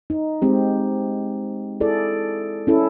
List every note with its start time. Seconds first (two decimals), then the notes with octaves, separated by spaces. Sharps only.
0.10 D#4
0.42 G#3 C4 G4
1.80 E4 G#4 A4 D5
2.67 C#4 E4 A4